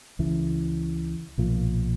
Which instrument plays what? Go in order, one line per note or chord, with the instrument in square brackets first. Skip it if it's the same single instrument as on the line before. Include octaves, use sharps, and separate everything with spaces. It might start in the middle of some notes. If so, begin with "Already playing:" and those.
[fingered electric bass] C#2 C#3 E3
B1 A#2 F3